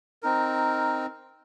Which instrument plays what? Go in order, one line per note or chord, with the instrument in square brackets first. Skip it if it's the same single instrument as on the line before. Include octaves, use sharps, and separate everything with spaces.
[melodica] C4 D#4 A#4